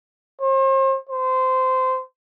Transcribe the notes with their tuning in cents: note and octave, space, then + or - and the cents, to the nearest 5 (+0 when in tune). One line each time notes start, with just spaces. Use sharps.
C5 +40
C5 -20